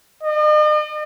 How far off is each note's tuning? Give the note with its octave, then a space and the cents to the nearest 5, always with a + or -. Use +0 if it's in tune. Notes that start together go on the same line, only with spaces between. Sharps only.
D#5 -45